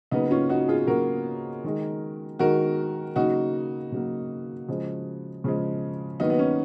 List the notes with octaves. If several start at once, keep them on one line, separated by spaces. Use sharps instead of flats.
C#3 F#3 A#3 B3 D#4
C#4 F4
D#4 F#4
F4 G#4
C#3 F#3 A#3 F#4 A#4
D#3 G#3
D#3 G#3 F#4 A#4
C#3 F#3 A#3 D#4 F#4
C#3 F#3 A#3
C#3 F3 G#3
C#3 F3 G#3
D#3 F#3 A#3 B3 D#4
B3
C#4